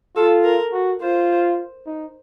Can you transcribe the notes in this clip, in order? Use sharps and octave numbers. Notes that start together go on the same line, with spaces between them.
F4 A4
A#4
F#4
F4 C5
D#4